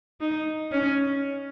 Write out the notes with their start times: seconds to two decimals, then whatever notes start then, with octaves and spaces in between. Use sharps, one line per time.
0.21 D#4
0.72 C#4